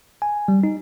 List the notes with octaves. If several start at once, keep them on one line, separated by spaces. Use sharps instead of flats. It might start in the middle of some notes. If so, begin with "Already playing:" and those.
G#5
G3
D#4